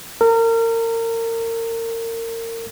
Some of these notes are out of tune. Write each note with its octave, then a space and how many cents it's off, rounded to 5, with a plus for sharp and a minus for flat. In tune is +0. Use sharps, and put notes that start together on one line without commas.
A#4 -30